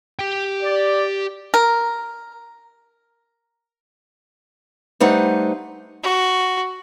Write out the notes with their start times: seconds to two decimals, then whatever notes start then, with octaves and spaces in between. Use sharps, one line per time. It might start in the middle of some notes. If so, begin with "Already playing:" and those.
0.19 G4 G5
0.62 D5
1.54 A#4
5.00 G3 A3 D#4 B4 C5 F#5
6.03 F#4